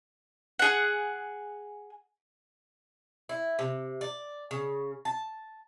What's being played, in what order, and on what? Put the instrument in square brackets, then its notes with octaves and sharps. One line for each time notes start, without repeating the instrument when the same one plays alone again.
[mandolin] G#4 F#5
[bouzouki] E4
C3
D5
C#3
A5